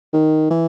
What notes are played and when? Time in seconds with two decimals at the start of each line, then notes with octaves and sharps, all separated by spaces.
0.13 D#3
0.50 E3